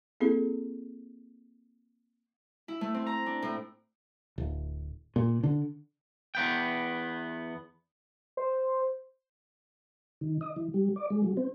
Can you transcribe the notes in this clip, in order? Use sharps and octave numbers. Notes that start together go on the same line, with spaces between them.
A#3 C4 E4 G#4 A4
E4
A3
C4
A#5
D4
A2
D1
A#2
D3
E2 B3 G5
C5
D#3
D#5
E3
G3
D5
G#3
F#3
C4